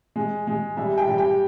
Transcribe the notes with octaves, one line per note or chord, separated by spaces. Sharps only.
G#3
G#3
G3 E5
G5
G3
G5